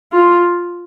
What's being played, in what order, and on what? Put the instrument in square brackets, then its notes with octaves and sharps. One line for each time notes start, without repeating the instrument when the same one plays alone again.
[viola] F4